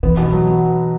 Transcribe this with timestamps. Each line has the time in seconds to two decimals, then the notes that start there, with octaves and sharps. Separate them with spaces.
0.03 E3 B3
0.17 B2
0.32 F#3